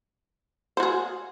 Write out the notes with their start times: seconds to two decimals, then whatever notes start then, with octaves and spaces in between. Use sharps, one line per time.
0.77 C5
0.80 F#4
0.83 G#4